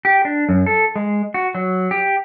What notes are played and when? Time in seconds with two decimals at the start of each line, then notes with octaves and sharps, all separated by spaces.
0.05 G4
0.25 D4
0.49 F#2
0.66 A4
0.96 G#3
1.34 F#4
1.55 F#3
1.91 G4